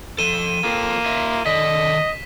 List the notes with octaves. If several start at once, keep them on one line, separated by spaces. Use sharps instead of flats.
F3 A4 D#7 E7 G7
A#3 F4 A4
F4 D#5 E5
D#3 A4 D5 D#5 B6